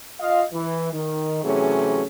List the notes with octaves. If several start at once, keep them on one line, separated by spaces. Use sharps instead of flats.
F4 D#5 F5
E3
D#3
C3 E3 F#3 A3 C#4 G#4